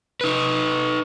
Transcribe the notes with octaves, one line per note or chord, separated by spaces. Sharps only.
D#4 B4